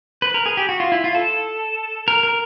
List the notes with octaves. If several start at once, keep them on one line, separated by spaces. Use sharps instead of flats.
B4
A#4
G#4
G4
F#4
F4
E4
F4
A4
A#4
A#4